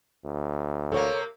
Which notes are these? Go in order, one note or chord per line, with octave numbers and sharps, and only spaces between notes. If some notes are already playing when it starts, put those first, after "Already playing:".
D2
C3 A#3 A4 C#5